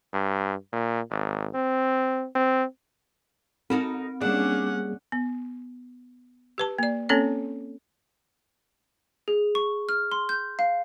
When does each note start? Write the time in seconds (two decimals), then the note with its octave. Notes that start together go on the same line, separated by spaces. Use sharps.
0.13 G2
0.73 A#2
1.10 G#1
1.54 C4
2.35 C4
3.70 C4 D#4 F#4 A4
4.21 G3 A#3 C#4 D4 G#4 F#5
5.12 B3
6.58 G4 B4 A5
6.79 A#3 D5
7.09 A#3 C4 C#4 A4 C#5
9.28 G#4
9.55 C#6
9.89 F6
10.12 C6
10.29 G6
10.59 F5